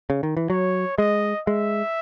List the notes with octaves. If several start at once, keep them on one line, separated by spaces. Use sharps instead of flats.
C#3
D#3
E3
F#3 C#5
G#3 D#5
G#3 E5